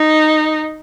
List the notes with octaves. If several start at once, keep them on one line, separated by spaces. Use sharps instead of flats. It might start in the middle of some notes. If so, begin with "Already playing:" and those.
Already playing: D#4